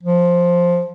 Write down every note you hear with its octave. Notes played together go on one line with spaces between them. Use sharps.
F3